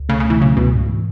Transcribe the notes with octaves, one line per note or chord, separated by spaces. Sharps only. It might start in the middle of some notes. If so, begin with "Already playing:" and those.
Already playing: C#2
C#3 A3
C#3
B2
E3
C#3 F#3
C#2 B2
G#2
E3